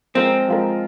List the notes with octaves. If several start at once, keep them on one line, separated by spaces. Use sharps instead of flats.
F3 G#3 C4 F4 A#4
F3 G#3 F4 A#4